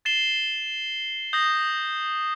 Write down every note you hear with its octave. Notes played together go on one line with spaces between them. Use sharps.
A6 C7 E7 G7
D#6 G6 A#6